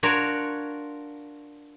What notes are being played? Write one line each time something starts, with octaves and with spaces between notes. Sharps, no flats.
D4 F4 F#4 A#4 C#5 D5